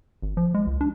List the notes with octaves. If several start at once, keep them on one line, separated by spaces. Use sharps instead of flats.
G#1
F3
G#3
C#2
D4